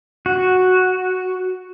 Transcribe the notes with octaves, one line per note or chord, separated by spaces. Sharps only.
F#4